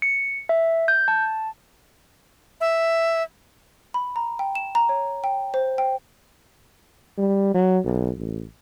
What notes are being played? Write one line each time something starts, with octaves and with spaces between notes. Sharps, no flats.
C#7
E5
G6
A5
E5
B5
A#5
G5
E7
A#5
C#5
G5
C5
G5
G3
F#3
B1
A1